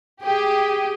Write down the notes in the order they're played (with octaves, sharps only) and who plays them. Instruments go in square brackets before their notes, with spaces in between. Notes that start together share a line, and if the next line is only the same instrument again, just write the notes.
[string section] G4 [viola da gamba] G#4